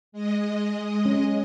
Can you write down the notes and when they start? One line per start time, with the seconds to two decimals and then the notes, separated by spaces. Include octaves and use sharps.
0.12 G#3 D#5
1.05 C#4